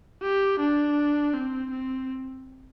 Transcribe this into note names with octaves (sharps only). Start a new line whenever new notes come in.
G4
D4
C4
C4